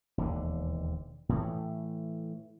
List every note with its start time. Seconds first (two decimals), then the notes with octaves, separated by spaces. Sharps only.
0.18 E1 D#2 D3
1.29 A2 E3 A3